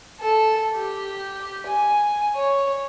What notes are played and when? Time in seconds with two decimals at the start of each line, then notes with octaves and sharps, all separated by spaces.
0.20 A4
0.76 G4
1.66 G#5
2.36 C#5